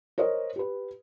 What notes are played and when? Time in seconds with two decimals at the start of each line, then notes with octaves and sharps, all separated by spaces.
0.18 A#4 C5 C#5 D#5
0.56 G4 B4